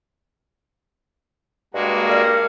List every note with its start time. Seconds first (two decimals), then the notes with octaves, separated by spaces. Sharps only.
1.74 G2 G#3 A#3 F#4
2.09 A#4 D5 F6